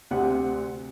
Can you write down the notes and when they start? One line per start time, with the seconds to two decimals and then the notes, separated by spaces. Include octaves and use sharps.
0.11 D2 C3 F#5